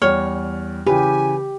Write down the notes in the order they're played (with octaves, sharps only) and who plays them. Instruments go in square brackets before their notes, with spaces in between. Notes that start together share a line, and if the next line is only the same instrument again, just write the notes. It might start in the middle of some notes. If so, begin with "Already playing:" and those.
[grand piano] E2 G3 F6 [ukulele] C#5
[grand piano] C#3 E3 [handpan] G4 [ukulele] B4 [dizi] G#5